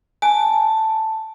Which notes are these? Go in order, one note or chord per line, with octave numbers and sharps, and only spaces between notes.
G#5 A5